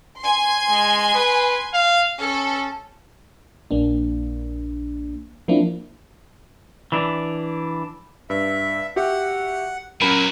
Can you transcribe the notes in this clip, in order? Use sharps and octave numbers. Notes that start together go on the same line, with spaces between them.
G#5 C6
G#3
B4
F5
C#4 A4
A#1 A#3 D4
F3 A#3 C4 D4 E4
E3 D4
G2 E5
F#4 G4 E5 F#5
A#2 F#3 C#4 F#4 A#4 B5 D#7